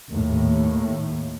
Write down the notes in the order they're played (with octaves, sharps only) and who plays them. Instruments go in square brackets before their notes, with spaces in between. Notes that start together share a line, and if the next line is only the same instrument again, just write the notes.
[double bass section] D#2 A2